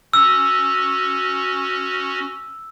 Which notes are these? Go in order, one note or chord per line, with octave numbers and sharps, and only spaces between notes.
C#4 F#4 E6